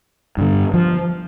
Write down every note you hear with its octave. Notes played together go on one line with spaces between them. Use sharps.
G2 D3
F3